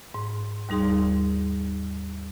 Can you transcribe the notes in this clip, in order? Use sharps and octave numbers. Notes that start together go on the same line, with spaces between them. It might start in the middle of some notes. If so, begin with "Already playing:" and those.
G#2
D#2 G3 D#4 G#4 C6